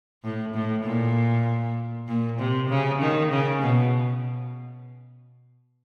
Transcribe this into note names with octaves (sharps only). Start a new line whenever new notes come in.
A2
A2
A#2
A#2
C3
C#3
D#3
C#3
B2